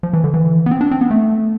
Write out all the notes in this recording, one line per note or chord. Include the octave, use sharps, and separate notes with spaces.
F3
E3
D3
E3
B3
C4
D4
C4
B3
A3